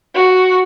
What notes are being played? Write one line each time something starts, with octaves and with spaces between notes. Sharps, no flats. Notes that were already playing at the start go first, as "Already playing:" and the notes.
F#4